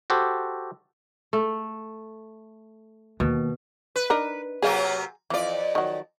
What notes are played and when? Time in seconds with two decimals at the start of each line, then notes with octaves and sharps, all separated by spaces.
0.10 F#4 G4 A4 C5
1.33 A3
3.20 D#2 B2
3.96 B4
4.10 D4 D#4 A#4
4.62 C3 F#3 A#3 G#4 F5
5.30 F2 E3 F4 D5
5.75 D#3 F#3